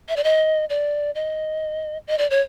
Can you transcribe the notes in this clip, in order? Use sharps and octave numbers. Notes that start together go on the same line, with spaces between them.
E5
D5
D#5
D5
D#5
D#5
D5
C#5